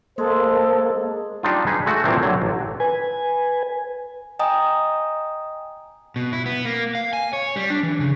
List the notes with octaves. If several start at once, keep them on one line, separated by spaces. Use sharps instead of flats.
G#3 A#3 A4 C5
G3 D4 D#4 F4
D#4 G#4 B4
G#3 A3 F#4
A#2 E3 A#3 C4 D4
D3 F#3
A1
B4 G#5
D#5 G5 G#5 A#5 D#6
B2
E4
B3
A#3
F5
G#5
C#5
G3
D4
E3
C#3